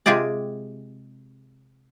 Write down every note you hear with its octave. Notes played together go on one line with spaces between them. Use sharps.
C3 G#3 F4 G4 G#4 D5